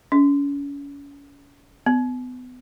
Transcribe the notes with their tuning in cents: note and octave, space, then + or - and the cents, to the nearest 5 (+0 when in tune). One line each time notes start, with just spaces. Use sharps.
C#4 +35
B3 +30